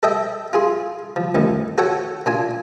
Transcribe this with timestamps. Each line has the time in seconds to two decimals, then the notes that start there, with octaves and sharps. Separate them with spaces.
0.03 A4 D#5 E5 G5
0.53 F4 G#4 C6
1.16 F3
1.35 A1 F2 D#3
1.78 F#4 A4 C#5 F#5 G5
2.26 A#2 D4 F4 G#5